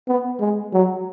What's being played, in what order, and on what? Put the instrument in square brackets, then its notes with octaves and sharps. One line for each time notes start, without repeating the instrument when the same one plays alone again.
[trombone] B3
G#3
F#3